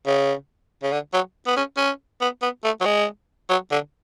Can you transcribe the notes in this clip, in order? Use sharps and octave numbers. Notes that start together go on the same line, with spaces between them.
C#3
C#3
D3
F#3
B3
C#4
C#4
B3
B3
A3
F#3
G#3
F#3
D3